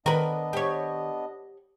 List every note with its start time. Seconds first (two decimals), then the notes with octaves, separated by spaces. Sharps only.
0.06 D#3 B3 D4 A#4 B4 D#5
0.53 G4 C#5